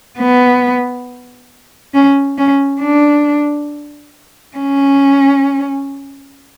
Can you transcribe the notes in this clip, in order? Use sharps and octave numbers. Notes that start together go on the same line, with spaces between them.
B3
C#4
C#4
D4
C#4